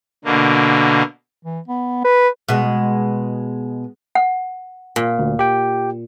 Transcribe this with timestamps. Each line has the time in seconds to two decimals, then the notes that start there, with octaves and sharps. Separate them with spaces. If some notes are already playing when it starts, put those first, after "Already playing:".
0.25 B2 D3 A#3
1.44 E3
1.68 B3
2.04 B4
2.49 B2 G#3
4.15 F#5
4.96 A#2
5.19 D2
5.39 G4 G5